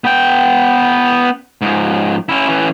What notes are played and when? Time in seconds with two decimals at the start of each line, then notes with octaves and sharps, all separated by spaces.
0.04 B3 G5
1.61 G#2 F3
2.29 C#4 E4
2.48 E3 C#4